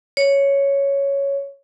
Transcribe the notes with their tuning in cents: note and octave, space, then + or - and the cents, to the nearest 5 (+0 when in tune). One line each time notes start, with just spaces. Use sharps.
C#5 +5